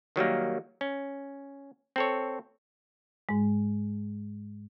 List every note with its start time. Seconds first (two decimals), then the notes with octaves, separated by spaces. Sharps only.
0.16 D#3 F#3 G3 A#3
0.81 C#4
1.96 C4 A4 C#5
3.29 G#2 G#3